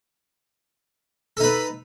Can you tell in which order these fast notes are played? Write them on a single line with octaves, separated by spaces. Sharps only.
A4 D#4 B4